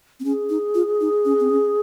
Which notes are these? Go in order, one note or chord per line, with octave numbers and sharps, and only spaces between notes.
C4
C#4 G#4
D#4
F4
D#4
C#4
C4
C#4